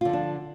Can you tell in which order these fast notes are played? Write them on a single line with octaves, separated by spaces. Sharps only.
F4 D3 F3 D4